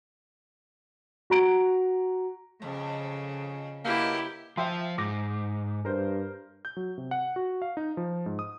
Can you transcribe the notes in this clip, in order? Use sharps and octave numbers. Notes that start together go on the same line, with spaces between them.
F#4 A#5 D7
F2 C#3
F#2 B2 A#3 B3 E4 G4
F3 C5 E5 G5 C6
G#2 D6 A#6
G2 A#4 C5
G6
F#3
C3
F#5
F#4
F5
D#4
F3
G#2
D#6